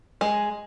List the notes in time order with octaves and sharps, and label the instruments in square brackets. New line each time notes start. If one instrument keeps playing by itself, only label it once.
[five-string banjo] G#3